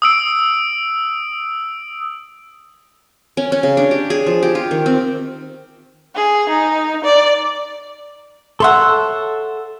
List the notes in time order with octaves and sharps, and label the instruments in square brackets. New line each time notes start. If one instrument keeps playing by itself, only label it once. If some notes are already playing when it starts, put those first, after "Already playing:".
[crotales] D#6 E6 D7
[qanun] C#4
C#4
C#3
D4
G4
G#4
F3
G4
F4
D#3
C4
[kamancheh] G#4
D#4
D5
[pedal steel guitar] A4 C6 E6 [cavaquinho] C#5 E5 F#5